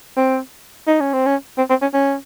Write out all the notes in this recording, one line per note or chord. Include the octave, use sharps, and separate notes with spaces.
C4
D#4
C#4
C4
C#4
C4
C4
C#4
C#4